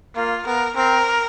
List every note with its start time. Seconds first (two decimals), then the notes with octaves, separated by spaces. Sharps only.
0.16 A#3 F4
0.46 B3 A#4
0.76 C4 A#4